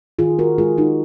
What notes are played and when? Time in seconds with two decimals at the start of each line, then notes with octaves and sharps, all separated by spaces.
0.19 D#3 F4 G#4
0.39 F#4 A#4
0.58 G#3 F4 G#4
0.78 D#4 F#4